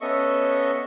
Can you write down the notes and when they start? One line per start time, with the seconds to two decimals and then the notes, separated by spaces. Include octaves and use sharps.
0.01 B3 C#4 A4 D#5 E5 C#6